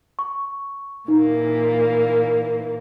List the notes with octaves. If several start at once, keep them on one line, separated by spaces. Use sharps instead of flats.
C#6
A#2 E3 A#3 D#4